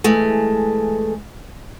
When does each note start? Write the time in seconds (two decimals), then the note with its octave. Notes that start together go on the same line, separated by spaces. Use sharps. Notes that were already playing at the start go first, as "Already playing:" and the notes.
0.04 E3 G#3 A3